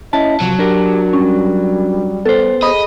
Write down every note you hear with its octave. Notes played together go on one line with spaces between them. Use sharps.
C#4 E4 D#5 A5
C2 F3 F#3
D4 G4 A#4
G3 C#4
B3 A4 C5
G#4 D#5 B5 D#6